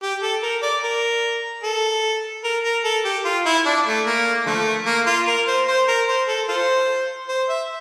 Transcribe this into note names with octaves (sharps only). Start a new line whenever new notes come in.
G4
A4
A#4
D5
A#4
A4
A#4
A#4
A4
G4
F4
E4
D4
A3
A#3
D3 F3 A3
A#3
F4
A#4
C5
C5
A#4
C5
A4
F4 A4 C5
C5
E5